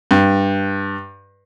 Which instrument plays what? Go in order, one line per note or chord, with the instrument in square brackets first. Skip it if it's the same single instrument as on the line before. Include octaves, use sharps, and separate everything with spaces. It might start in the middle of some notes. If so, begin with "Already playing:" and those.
[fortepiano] G2